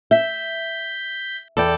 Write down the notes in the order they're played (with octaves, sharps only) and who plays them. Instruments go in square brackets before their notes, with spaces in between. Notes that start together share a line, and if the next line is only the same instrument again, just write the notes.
[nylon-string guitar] E5 [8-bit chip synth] G6 B6
[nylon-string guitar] E2 [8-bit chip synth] A4 D5 G5